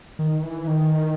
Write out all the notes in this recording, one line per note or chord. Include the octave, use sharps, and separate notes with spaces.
D#3
E3
D#3